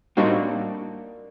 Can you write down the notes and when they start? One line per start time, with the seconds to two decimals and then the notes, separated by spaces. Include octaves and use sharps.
0.17 A2 G3 A#3 C4 D4 D#4 F#4